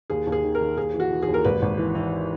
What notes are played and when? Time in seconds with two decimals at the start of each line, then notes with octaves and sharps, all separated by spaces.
0.10 D#2 G#4
0.27 D#2
0.32 G#4
0.43 D#3
0.55 A#4
0.60 D#3
0.77 D#2 G#4
0.94 E3
1.00 F#4
1.10 E3
1.23 G#4
1.28 D#2
1.34 A#4
1.44 G#1 B4
1.62 G#1
1.78 E3
1.95 E3